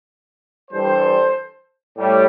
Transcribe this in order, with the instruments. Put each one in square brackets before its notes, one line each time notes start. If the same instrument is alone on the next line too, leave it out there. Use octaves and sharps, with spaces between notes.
[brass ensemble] G2 E3 G3 A4 C5
A2 G3